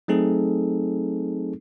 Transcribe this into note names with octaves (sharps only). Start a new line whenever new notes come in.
F#3 A3 C4 D#4 G#4 A4